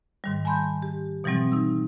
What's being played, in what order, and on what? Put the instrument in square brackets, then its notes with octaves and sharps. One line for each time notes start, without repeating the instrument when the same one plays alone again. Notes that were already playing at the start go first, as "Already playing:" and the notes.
[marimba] G#2 D#3 G3
G#5 A5 B5 C6 G6
G4
B2 E3 F#3 G3 C4
D#4 E6